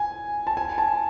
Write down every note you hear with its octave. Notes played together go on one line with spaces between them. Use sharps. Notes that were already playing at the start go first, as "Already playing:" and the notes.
Already playing: G#5
A5
G#5
A5